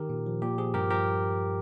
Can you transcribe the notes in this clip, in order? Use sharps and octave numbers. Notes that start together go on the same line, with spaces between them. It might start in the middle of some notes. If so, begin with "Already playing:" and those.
Already playing: D#3 G4 A#4
A#2
F3
A#2 G4
F3 G#4
G2 G4 A#4
F3 G4 A#4